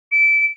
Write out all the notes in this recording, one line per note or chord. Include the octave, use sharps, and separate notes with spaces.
D7